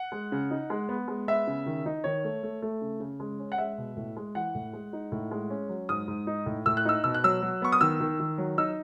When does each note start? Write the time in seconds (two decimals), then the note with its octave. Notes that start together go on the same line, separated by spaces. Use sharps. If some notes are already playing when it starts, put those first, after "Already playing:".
Already playing: F#5
0.12 G#3
0.32 C#3
0.51 D#4
0.70 G#3
0.89 B3
1.08 G#3
1.28 B3 E5
1.47 C#3
1.66 D#3
1.86 D#4
2.04 D#3 C#5
2.24 A3
2.43 A3
2.62 A3
2.81 C#3
3.00 C#3
3.20 G#3
3.39 C#4
3.52 F#5
3.58 G#3 E5
3.78 B2
3.97 A2
4.16 G#3
4.35 E3 F#5
4.55 A2
4.73 G#3
4.93 D#4
5.12 A2
5.31 G#3
5.50 C#4
5.69 F#3
5.89 G#2 D#6
6.08 G#2
6.27 D#4
6.46 A2
6.66 A2 E6
6.77 F#6
6.85 D#4 E6
7.04 B2 E6
7.14 F#6
7.24 F#3 E6
7.42 F#3
7.62 B3 C#6
7.72 D#6
7.81 D#3 E6
8.00 D#3
8.20 D#3
8.38 F#3
8.58 D#4 E6